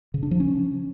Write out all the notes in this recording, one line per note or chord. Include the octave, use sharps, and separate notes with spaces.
C#3
D4
F3
C#4